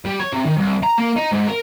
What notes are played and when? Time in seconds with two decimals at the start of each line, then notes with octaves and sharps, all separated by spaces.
0.05 G3
0.20 C#5
0.33 C3
0.46 D#3
0.57 C2
0.83 A#5
0.98 A#3
1.16 D#4
1.32 G#2
1.47 A#4